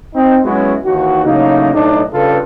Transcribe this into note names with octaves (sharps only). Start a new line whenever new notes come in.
C4 D#4
F#3 G#3 B3 C#4 E4 F#4
D#2 D#3 E3 F#4
A2 C#3 F#3 A#3 D#4
B1 A2 D4 D#4
G2 C#3 F4 A4 B4